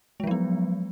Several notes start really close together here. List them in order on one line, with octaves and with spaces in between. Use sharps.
G#3 F3 F#3 B3